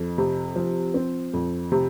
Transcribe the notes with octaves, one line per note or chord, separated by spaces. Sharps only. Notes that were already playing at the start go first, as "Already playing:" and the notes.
Already playing: F2
C3
F3
C4
F2
C3